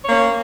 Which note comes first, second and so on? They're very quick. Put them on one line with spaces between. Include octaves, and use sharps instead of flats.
C#5 A#3 C#4